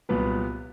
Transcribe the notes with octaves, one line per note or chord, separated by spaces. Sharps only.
C2 A#2 F#3 B3 B4